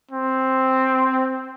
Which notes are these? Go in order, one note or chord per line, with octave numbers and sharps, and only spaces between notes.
C4